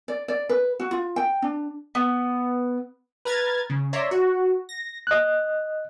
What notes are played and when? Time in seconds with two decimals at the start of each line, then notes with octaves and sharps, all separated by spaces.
0.08 D5
0.28 D5
0.49 B4
0.80 F#4
0.91 F4
1.16 G5
1.42 D4
1.95 B3
3.25 B4 A#5 F6 G#6 A6
3.70 C#3
3.93 C#5 D5 E5 A#5 C6
4.11 F#4
4.69 A#6
5.07 D#5 F#6